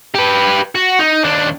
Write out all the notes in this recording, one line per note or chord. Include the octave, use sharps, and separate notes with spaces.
G4 B4
F#4
D#4
D#2 D4